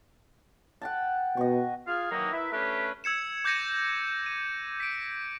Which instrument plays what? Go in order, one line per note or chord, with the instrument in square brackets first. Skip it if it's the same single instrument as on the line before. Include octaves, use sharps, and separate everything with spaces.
[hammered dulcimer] F#5 G5 A5
[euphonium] B2 [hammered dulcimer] D#5 C#6
[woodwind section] F4 G#4 F5
D#3 E3 F#3 A#3 D#4
E4 A#4 B4 E5
A3 C#4 D4 G4 B4
[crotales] E6 G#6 C#7 E7
D6 G6 G#6 A#6 C#7 D#7
D#7
B6 D7